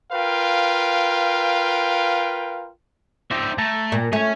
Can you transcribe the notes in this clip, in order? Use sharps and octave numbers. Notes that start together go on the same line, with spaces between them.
F4 A#4 B4 F5 G5
D#4 C5 D5 E5 G5
A3 A5 A#5
A#2
A3 C#4 C#5 G#5